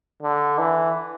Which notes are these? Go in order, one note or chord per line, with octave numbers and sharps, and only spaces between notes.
D3
E3